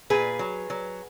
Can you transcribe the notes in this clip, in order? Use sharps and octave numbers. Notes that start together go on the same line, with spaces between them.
A#2 G#4 B4
F#3
F#3